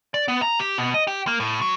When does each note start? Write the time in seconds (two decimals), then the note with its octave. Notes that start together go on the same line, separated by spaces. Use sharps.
0.14 D5
0.28 B3
0.42 A#5
0.59 G4
0.78 B2
0.94 D#5
1.07 G4
1.27 A#3
1.40 A2
1.61 F#3